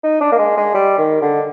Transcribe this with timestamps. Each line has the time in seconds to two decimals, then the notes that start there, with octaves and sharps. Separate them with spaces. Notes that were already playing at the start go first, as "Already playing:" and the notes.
0.03 D#4
0.21 D4
0.32 A#3
0.39 G#3
0.57 G#3
0.74 G3
0.98 D#3
1.22 D3